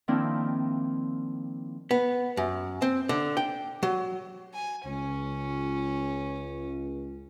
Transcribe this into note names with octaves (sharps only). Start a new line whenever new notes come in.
D#3 F3 A#3 C4 D4 E4
B3
F#2
C4
D3
G5
F#3
G#5
C#2 C#4